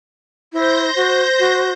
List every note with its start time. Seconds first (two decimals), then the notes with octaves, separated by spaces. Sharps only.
0.53 E4 C5 G6 A#6
0.96 F#4
1.39 F#4